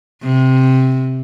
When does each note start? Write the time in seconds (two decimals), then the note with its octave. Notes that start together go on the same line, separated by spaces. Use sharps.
0.23 C3